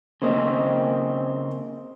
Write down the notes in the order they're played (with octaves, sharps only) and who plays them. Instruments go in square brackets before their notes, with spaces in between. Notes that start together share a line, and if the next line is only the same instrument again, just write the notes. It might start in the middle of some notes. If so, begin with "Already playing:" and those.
[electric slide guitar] C#3 A#3 C4 [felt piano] C5 D#5